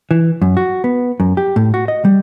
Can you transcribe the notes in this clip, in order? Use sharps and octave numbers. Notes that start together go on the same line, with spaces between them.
E3
F#2
F#4
B3
F#2
G4
A2
F#4
D#5
G3